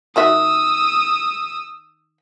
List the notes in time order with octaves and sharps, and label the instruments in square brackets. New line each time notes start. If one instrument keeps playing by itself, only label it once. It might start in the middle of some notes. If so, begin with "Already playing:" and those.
[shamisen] D#3 F#4 E5 [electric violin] D#6 E6